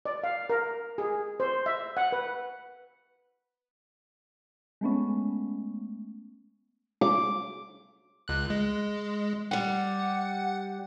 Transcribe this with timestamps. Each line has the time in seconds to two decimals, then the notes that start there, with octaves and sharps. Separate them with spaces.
0.05 D5
0.24 F5
0.50 A#4
0.98 G#4
1.40 C5
1.66 E5
1.97 F#5
2.12 B4
4.81 G#3 A3 B3 C#4
7.01 D6
8.28 C#2 F#6
8.50 G#3
9.51 G3 G4 F#5